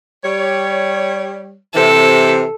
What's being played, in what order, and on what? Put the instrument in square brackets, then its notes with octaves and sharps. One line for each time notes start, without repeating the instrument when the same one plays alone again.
[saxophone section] G3 C#5
[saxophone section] C3 E3 [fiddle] A4